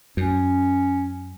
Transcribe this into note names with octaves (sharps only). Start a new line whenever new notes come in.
F#2 C#4